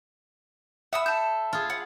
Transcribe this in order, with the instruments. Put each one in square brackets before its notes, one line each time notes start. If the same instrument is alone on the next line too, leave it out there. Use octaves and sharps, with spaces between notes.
[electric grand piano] E5 B5 [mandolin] F#5 D#6 E6
[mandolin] A4 [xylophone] A5 G6
[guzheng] F4 G#4
[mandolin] F#5